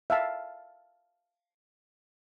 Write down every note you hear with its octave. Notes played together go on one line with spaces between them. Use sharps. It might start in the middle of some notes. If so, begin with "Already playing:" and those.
E5 F5 A5